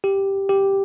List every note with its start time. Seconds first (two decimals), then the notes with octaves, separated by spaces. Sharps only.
0.04 G4
0.49 G4